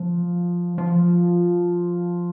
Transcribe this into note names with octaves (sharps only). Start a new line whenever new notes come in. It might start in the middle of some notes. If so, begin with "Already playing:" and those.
Already playing: F3
F3